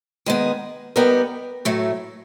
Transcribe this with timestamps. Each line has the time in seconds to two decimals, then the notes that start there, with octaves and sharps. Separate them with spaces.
0.26 D#3 G#3 B3
0.96 G3 B3 D#4 G4 A#4
1.65 A2 F#3 A3